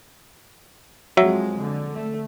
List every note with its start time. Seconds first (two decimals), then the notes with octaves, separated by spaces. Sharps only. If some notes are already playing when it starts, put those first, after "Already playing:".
1.17 F2 F3 F#3 G#3 E5
1.59 D3
1.95 A3